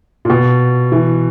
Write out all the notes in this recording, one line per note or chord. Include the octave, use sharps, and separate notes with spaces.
A#2
B2
E3